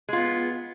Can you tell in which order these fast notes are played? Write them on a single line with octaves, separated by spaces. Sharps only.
G#3 F4 B3